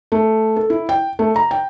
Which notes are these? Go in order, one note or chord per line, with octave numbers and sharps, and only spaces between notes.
A3
A4
E4
G5
A3
A#5
G5